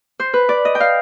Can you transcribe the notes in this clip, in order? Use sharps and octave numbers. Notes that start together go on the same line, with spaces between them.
C5
B4
D5
D#5
G5
F5